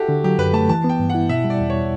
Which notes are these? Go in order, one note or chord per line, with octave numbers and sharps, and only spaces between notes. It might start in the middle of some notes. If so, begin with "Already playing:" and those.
Already playing: E4 F#4 G4 A4
D3
F#3 G4
F#2 B4
A3 A5
E3 A5
B3
G5
G2
E4 F#5
B2 E5
G3
D5
E2
C#5